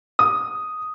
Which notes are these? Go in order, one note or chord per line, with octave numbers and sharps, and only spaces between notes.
D#6